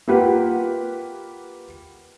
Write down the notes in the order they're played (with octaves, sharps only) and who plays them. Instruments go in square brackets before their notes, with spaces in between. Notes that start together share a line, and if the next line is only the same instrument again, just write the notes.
[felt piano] A#3 F4 G4 B4 F#5